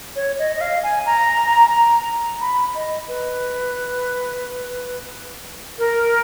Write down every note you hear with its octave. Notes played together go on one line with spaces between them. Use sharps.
C#5
D#5
D#5
F5
G#5
A#5
B5
D#5
B4
A#4